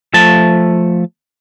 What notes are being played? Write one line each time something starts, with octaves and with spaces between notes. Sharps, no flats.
F3 A3 A5